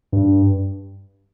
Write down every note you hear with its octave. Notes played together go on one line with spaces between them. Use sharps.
G2